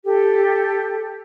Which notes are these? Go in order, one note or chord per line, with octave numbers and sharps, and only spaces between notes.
G4 A4